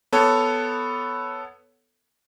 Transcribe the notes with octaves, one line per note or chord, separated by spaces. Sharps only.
B3 A4 C#5